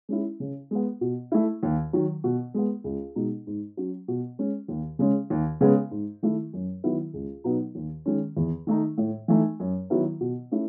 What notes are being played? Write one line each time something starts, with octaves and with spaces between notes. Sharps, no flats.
G#3 C#4 E4
C#3
G#3 B3
B2
A3 E4
D#2
D#3 F#3
B2
G#3 B3
C#2
B2 G#3 D#4
G#2
F#3 C#4
B2
G#3 C#4
D#2
C#3 G#3 C#4
D#2
C#3 G#3 B3
G#2
D#3 A3 E4
F#2
D#3 F#3 B3 E4
C#2
B2 F#3 B3 D#4
D#2
D#3 G#3 C#4
E2
D#3 A3 D#4
A2
E3 A3 D#4
F#2
D#3 F#3 B3 E4
B2
A3 C#4 E4